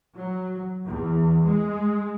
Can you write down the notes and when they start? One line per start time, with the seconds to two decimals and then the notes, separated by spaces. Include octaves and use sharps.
0.17 F#3
0.86 E2
1.47 G#3